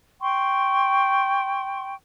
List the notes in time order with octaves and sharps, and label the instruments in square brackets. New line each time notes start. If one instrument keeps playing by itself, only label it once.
[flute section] G5 C6 C#6